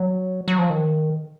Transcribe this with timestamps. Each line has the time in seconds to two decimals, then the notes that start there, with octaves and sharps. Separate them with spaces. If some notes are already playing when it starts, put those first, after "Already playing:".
Already playing: F#3
0.48 F#3
0.59 F3
0.70 D#3